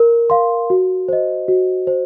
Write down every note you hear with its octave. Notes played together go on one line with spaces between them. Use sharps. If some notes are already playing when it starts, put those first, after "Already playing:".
Already playing: A#4
F5 C6
F#4
C5 D#5
F#4
C5